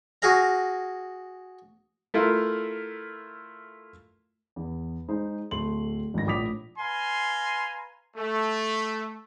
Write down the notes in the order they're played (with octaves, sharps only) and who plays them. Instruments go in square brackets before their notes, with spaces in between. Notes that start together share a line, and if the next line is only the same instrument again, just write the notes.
[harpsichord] F#4 G#4 F5 A#5
[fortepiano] A3 E4 F4 A#4
[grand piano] E2
G#3 D#4 C5
D1 A3 C6 F#7
G#1 G2 A#6
A#1 A2 D6 D#6 B6 F7
[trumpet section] B4 F5 G#5 A#5 C6
A3